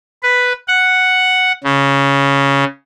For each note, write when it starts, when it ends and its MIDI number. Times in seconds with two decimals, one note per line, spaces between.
0.23 0.52 71
0.68 1.52 78
1.64 2.64 49